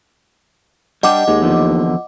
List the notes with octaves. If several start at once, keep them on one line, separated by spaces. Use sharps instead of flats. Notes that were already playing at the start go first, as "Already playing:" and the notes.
G3 D4 G4 D#5 F#5 D6
D#2 G#3
E2 D3 F3